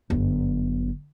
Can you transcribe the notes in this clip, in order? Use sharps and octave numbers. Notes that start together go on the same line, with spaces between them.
G1 F#2